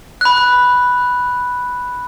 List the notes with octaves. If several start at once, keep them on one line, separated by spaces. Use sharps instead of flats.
B5 F#6